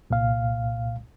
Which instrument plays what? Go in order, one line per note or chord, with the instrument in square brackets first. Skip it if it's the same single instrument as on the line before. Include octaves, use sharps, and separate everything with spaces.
[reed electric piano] C2 A#2 F5